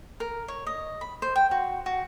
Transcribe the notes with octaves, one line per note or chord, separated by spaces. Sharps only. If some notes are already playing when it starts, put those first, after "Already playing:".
A#4
C#5
D#5
B5
C5
G5
F#4
F#4